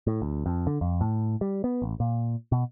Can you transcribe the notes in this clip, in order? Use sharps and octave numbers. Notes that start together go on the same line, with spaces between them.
A2
D2
F2
D3
F2
A2
G3
B3
A1
A#2
B2